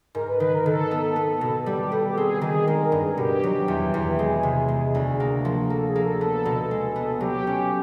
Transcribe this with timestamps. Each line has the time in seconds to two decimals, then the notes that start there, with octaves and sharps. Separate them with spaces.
0.15 G#2 A#4
0.28 B4
0.40 D#3 B4
0.53 A#4
0.66 D#3 A4
0.91 B3
1.16 B3
1.41 B2
1.66 G3 G4
1.79 G4
1.92 B3 A4
2.04 G4
2.17 C4 G#4
2.41 D#3 G#4
2.67 G#3 A#4
2.84 A#4
2.92 G2
3.01 G#4
3.17 B2 G4
3.44 F#3
3.68 E2
3.94 E2
4.19 G#3 G#4
4.43 C3
4.68 G#3
4.95 D2
5.20 A#3
5.45 F3
5.70 A#3 A4
5.87 G#4
5.95 A#3
6.03 A4
6.20 B3 A4
6.45 B2
6.71 G#3
6.96 B3
7.21 F#3 G4
7.47 C#4